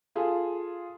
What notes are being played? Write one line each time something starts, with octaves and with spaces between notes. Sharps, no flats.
F4 G#4 A4